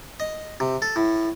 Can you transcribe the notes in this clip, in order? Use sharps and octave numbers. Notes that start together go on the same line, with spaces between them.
D#5
C3
A4
A2